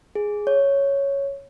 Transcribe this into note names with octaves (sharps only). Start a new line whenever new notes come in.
G#4
C#5